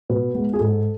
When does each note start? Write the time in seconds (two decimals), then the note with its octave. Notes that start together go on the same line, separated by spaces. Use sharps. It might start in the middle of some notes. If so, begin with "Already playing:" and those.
0.09 B2 B4
0.35 G#3 B3
0.53 G#4
0.59 G#2 A4